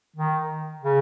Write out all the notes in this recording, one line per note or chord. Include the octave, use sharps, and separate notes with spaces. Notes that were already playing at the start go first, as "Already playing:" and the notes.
D#3
C#3